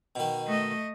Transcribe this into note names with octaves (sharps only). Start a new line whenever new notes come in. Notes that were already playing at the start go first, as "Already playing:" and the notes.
B2 D#3
A3 D#5